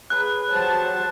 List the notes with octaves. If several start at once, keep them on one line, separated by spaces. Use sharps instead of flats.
G#4 B4 C#5 F#6
F#3 G4 C5 F#5 A5